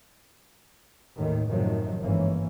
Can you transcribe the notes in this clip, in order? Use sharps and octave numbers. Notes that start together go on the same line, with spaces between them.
D#2 A2 D#3
F#2 A2 C3 D#3 F3 F#3
G1 G#2 E3 A#3 C#4